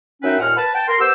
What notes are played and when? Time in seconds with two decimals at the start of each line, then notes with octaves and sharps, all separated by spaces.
0.22 F#2 C#4 D#4 B4 E5 G5
0.39 D#2 A#2 F#5 F6
0.56 B4 A5
0.73 G5 A5
0.87 A#4 C6
0.99 B3 G4 C5 G5 E6